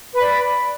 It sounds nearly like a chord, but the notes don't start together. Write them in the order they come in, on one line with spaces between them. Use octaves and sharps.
B4 B5 D5